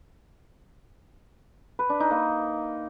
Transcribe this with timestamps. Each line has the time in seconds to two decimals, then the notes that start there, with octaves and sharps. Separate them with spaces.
1.79 B4
1.90 D4
2.00 D#4
2.11 A#3